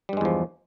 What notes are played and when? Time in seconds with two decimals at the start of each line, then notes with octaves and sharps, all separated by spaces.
0.09 G3
0.13 G2
0.17 G#3
0.21 E2
0.25 F3